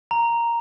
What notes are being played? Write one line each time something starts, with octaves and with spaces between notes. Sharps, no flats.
A#5